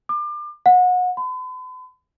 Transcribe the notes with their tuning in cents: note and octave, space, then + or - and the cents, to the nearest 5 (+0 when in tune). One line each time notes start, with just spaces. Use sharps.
D6 +30
F#5 -30
B5 +45